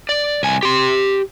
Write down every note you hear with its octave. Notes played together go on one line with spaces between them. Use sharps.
D5
C2 G#5
G4 C6